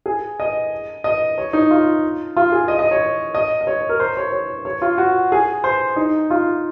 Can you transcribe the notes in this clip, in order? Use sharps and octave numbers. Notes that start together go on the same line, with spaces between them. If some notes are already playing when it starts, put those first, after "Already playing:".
G#4
D#5
D#5
C#5
D#4
F4
F4
G#4
D#5
D#5
C#5
D#5
D#5
C#5
A#4
C5
C#5
C#5
C#5
F4
F#4
G#4
C5
D#4
F4